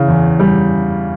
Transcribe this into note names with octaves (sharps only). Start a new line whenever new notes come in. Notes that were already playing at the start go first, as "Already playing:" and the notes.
Already playing: C#3 E3
E2
G3